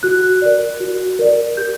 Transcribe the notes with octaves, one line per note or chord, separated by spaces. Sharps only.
F#4 F#6
A#4 D5
F#4
A#4 D5
G4 G6